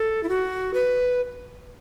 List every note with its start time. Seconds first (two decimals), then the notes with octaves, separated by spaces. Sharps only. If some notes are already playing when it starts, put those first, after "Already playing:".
Already playing: A4
0.23 E4
0.29 F#4
0.74 B4